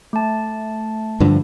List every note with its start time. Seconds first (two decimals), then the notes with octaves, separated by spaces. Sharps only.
0.13 A3 A5
1.20 G2 D3 F3